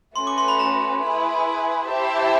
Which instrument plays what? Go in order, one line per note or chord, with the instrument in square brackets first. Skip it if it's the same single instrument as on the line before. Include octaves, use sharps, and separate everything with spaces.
[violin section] A3 C#4 F#4 B4 [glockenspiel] C6
[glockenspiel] D6
C6
B5
A#5
[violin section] E4 G#4 B4
E4 G4 C5 E5 A5